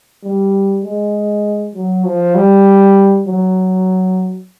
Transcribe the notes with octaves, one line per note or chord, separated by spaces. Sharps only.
G3
G#3
F#3
F3
G3
F#3